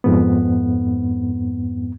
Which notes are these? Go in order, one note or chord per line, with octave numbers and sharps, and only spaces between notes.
F2 G#2 B3